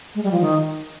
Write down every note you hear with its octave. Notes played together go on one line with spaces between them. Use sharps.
G#3
G3
F3
D#3